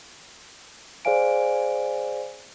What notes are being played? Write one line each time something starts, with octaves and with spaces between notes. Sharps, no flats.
G#4 C5 D5 F5 G#5 D7